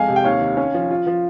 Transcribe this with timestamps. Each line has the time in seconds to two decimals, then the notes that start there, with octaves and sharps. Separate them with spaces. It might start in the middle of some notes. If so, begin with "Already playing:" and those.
Already playing: F2 G#3 F5 G#5
0.08 C3
0.16 G5
0.24 D#2 C#5 F5
0.41 D#3
0.57 C#4
0.74 F3
0.91 F4
1.07 F3